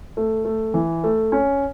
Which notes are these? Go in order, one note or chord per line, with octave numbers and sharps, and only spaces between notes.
A3
A3
E3
A3
C#4